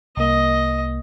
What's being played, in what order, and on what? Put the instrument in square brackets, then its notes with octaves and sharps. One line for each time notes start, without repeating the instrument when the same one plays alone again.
[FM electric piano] C2 A#3 [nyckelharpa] D#5